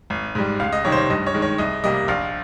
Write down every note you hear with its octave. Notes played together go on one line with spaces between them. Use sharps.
G#1
G#2 G3
C#2 F5
D#5
C3 D#3 G3 C#5
C5
C#5
G2 D#5
C#5
D#3 G#3
C#5
C2 D#5
C3 G3 A#3 D#5
A#1 F5